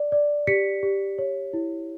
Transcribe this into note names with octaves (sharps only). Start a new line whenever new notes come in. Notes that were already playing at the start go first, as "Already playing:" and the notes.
Already playing: D5
D5
G4 B6 C#7
G4
C#5
E4